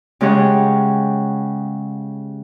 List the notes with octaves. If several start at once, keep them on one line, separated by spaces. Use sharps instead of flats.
C#3 G#3 G4 G#4 C#5 F#5